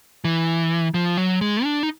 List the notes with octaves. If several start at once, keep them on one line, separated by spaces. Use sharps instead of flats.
E3
F3
F#3
G#3
D4
D#4